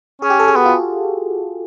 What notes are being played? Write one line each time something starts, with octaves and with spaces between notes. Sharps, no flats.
C#4 G#4
G4
A4
G#4
B3 F#4
F4